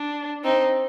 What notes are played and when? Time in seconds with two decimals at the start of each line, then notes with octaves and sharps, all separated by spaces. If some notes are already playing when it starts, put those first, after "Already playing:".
Already playing: D4
0.44 C4 D#4